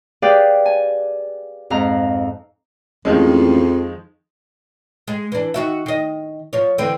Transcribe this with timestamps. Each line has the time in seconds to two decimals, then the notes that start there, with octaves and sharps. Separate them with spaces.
0.22 G4 G#4 B4 D5 F5 G5
0.66 G#5
1.70 F2 G#2 F5 A#5
3.05 A1 F2 D#3 F3 G#3
5.08 G#3
5.32 E3 D4
5.54 D#3 F#4 E5
5.86 D#3 D#5
6.53 F3 C#5
6.78 D3 E3 C4